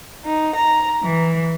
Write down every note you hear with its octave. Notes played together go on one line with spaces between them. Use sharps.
D#4
A#5
E3